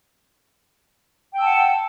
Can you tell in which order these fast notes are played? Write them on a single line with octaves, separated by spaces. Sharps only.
G5 E6 A5 F#5